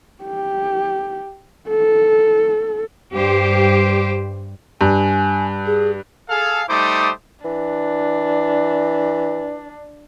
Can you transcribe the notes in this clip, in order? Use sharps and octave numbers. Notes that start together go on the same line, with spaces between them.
G4
A4
G2 G4 C5
G2 G#5
G#4
G#4 A4 F5
G3 A3 D#4 C5 D6 D#6
E3 D4